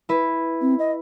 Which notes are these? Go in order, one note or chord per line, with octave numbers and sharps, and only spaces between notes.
E4 B4
C4
D#5